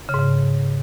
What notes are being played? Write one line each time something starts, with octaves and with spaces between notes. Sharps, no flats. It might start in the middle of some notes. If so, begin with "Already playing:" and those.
C#3
G#2
C#3